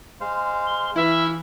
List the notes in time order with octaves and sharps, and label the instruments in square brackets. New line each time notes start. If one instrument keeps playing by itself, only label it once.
[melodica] G#3 C5 F5
[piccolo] G7
[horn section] E3 [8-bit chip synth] E4 [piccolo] E5 [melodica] F5